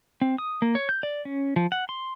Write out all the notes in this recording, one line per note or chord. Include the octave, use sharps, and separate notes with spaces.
C4
D#6
A#3
C#5
G6
D5
C#4
F3
F#5
C6